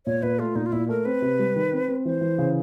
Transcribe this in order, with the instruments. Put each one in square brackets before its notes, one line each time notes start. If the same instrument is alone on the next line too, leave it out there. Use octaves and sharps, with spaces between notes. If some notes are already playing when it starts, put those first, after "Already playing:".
[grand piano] A#2 [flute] C#5
[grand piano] A#2 [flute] B4
[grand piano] A3 [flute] F4
[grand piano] A#2 [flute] D#4
[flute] F4
[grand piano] A#2 [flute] E4
[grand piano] A3 [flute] A#4
[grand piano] C4 [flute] B4
[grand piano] C3
G3
D#3
C4
C4
[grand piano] E3 [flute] C5
[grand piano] E3
C#3